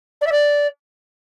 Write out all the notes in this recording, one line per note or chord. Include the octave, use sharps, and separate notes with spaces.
D5
E5
D5